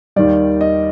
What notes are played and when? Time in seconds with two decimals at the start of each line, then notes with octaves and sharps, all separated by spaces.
0.16 D#2 D#3 G3 D5
0.61 D#5